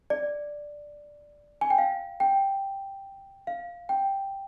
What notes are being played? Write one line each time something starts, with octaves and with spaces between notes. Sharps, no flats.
D5
G#5
G5
F5
G5
F5
G5